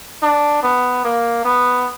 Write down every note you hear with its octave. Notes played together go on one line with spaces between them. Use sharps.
D4
B3
A#3
B3